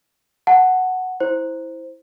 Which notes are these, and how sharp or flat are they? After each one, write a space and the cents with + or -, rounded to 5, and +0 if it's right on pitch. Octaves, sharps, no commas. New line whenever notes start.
F#5 +0 A5 +0
E4 -10 C5 +0